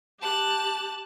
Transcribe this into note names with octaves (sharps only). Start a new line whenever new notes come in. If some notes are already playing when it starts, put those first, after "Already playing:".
G4 A5 F#6